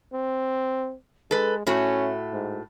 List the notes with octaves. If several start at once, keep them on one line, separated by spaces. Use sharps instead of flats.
C4
G#3 A4 B4
A2 A3 C#4 F#4
G#2